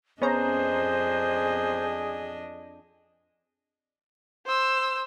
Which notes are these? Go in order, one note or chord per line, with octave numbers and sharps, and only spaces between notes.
F2 B3 C#4 D4 G#4 C5 D#5 A#5
C5 E6